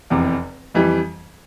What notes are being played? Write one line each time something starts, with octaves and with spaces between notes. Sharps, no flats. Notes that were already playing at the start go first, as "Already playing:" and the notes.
F1 E2 C3
F2 E3 G3